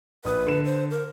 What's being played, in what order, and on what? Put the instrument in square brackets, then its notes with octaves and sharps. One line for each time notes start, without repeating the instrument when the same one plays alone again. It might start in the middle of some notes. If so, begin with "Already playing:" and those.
[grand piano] A#1 D#6 [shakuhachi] B4
[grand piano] D3 E7
[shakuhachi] C5
A#4